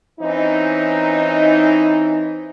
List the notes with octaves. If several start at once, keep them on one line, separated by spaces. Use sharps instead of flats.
E3 C4 C#4 D#4